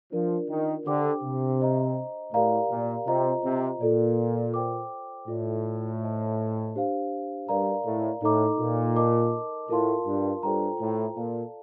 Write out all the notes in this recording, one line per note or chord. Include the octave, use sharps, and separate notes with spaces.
F3 D4 F4 A#4 D5
D#3
D3 D4 G4 C5 G5 D6
C3
C5 D#5 A#5
A2 G4 A#4 D5 F5 A#5
A#2
C3 F4 C5 D#5 A#5
C3
A#2 F4 A4 D5
C5 G5 D6
A2 F4 A4 D5
C5 D#5 A5
D4 G4 C5 F5
G2 A#4 D5 F5 A#5
A2
A2 D#4 A4 D#5 A#5 D6
A#2
A#4 D#5 A5 D6
A2 F4 A#4 F5 A5 C6
G2
G2 F4 A4 C5 G5 A#5
A2
A#2 A4 D5 F5 A5